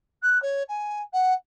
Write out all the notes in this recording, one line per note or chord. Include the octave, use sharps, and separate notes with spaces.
F#6
C#5
G#5
F#5